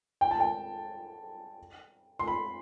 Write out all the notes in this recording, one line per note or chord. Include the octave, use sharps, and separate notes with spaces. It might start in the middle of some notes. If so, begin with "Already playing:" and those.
G5
A5
G5
C6
B5